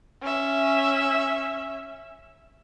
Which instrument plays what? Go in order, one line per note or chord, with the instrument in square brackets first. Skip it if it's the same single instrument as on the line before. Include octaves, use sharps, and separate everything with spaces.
[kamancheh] C#4 E5